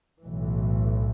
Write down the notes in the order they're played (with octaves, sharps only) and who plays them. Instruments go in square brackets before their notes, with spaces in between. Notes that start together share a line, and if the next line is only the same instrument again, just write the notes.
[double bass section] B1 A2 E3